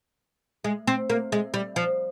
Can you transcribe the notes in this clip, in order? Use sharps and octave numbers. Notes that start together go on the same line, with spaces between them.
G#3
C4
A#3
G#3
G3
F3